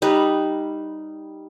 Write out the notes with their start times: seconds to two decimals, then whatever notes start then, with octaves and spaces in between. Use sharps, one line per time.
0.02 G3 D#4 B4